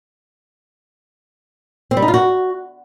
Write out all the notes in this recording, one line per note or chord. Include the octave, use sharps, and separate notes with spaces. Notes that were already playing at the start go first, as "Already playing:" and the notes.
C4
G3
D#4
F4
F#4